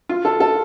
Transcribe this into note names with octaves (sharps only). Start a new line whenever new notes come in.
F4
A4
A4